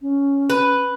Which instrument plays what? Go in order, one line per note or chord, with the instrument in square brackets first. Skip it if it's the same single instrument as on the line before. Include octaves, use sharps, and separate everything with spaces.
[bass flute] C#4
[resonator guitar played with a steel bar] B4